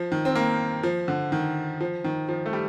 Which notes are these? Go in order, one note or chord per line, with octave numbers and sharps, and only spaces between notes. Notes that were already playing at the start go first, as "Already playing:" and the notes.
Already playing: F3
D#3
C4
A#3
F3
D3
D#3
F3
D#3
F3
A3
G3